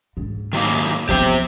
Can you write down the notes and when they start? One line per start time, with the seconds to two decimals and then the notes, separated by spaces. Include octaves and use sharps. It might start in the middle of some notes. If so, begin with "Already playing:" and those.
0.17 G#2
0.53 D#3 F#3 A#3
1.09 F3 B3 G4 C5 G5